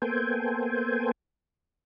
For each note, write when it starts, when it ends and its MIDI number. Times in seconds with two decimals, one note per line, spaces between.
0.02 1.11 58
0.02 1.11 59
0.02 1.11 69
0.02 1.11 72
0.02 1.11 79
0.02 1.11 80